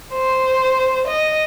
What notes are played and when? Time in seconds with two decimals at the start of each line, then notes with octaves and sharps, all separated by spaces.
0.13 C5
1.07 D#5